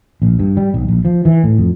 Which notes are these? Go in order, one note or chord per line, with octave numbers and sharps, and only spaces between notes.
A#1
G2
G3
B1
A#1
F3
E3
A2
F2